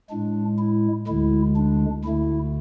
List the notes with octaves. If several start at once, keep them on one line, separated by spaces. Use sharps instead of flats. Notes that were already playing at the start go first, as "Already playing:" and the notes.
A2 G#3 D4
E4
D2 D3 G#3 E4
D4
D2 D3 A3 E4